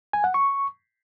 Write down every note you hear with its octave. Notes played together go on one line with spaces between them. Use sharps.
G#5
F#5
C#6